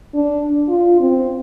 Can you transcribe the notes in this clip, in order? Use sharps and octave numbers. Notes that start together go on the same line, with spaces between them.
D4
F4
C4